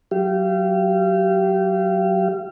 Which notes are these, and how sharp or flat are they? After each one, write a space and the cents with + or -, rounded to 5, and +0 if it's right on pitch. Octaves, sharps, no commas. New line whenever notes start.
F#3 +0 G4 -25 F5 -35